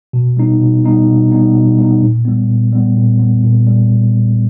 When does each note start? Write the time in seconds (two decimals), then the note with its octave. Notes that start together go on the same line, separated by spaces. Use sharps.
0.13 B2
0.37 G3 B3 D#4
0.61 B2
0.84 G3 B3 D#4
1.08 B2
1.31 G3 B3 D#4
1.54 B2
1.78 G3 B3 D#4
2.01 A#2
2.25 G3 B3
2.48 A#2
2.72 G3 B3
2.96 A#2
3.19 G3 B3
3.43 A#2
3.67 G3